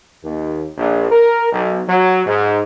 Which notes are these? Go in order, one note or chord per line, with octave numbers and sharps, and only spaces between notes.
D#2
A#1
A#4
B1
F#3
G#2